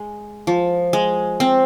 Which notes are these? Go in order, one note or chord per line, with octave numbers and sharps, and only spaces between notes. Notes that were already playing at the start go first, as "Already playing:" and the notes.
Already playing: G#3
F3
G#3
C4